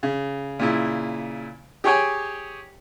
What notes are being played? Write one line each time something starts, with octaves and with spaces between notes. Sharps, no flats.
C#3
A#2 C#3 E4
G4 G#4 C#5 G5 G#5